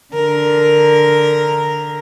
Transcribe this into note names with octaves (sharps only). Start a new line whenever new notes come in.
D3 A#4